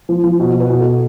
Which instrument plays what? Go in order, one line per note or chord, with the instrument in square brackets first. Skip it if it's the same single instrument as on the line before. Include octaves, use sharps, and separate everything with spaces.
[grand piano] F3
F3
B2
B2
B4
B2
A4
B2